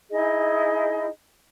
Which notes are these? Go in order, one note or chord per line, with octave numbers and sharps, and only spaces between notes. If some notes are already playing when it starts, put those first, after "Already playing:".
D#4 E4 G#4 D#5